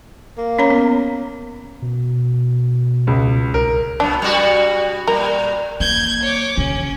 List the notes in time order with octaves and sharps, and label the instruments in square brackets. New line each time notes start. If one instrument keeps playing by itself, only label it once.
[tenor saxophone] A#3
[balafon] C#4 C#5 A#5
B3
[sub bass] B2
[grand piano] C#2
[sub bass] C2 [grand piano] A#4
[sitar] A#2 F#3 B3 [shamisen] D4
[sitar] B2 G3 F#4
[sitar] A#2 G3 [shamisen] A#4
[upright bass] A#3 [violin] G6 G#6
[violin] C#5 D6
[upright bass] C#3 [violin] C#4